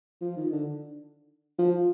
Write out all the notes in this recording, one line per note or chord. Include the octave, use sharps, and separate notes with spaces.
F3
D#3
D3
F3